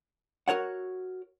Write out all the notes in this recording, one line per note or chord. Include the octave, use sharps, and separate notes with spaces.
F#4 A#4 C#5 F#5